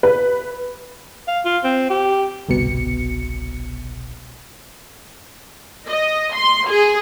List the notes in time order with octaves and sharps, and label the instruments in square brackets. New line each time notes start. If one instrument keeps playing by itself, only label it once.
[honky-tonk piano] B4
[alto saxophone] F5
F4
C4
G4
[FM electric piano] G1 C2 B2 C#7
[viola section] D#5
C6
G#4